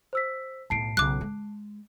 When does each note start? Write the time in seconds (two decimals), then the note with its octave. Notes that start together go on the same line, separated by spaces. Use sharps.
0.13 C5 E6 B6
0.70 B1 A2 A5 C7 D7
0.97 B1 C#3 D6 F#6
1.21 G#3